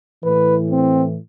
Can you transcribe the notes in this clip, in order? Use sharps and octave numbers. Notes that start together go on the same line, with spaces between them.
A2 E3 B4
C4